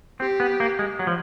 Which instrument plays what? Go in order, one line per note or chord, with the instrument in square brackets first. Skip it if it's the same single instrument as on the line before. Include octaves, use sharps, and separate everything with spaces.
[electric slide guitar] C4 [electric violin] G4
[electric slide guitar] B3
A#3
G#3
F#3
F3